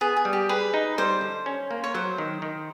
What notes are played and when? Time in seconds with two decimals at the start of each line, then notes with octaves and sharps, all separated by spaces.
0.01 B3 G#4
0.16 G#4
0.25 G3
0.33 G4
0.49 G#4 B4
0.74 D#4
0.98 G3 C5
1.21 D3
1.46 C#4
1.71 A#3
1.84 C#5
1.95 F#3 C5
2.18 D#3
2.42 D#3